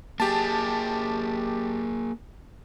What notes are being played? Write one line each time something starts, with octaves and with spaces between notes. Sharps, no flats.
A#3 G4 G#4 A5